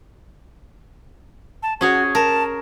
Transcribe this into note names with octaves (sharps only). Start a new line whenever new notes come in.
A5
C#4 F#4 G#4 C#5
A#4 A5